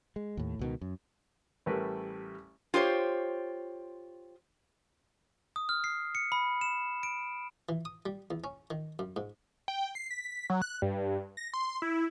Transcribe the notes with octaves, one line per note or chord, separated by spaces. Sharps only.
G#3
D#2 A2
C#2 B2 D#3
F#2
A1 G3 A3 A#4 B4
F4 G4 C5 C#5
D#6
F6
C7
C#7
B5
E7
D7
E3
D#6
G3
E2
C#4
D#3
F#2
G#2
G5
C7
B6
F#3
F#6
G2
A#6
C6
E4